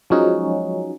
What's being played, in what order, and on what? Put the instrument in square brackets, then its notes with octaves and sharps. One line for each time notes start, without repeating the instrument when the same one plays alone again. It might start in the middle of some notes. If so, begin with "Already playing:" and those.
[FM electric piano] F3 F#3 G#3 C#4 D#4 F#4